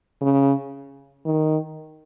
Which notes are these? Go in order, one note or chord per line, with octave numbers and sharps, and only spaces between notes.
C#3
D#3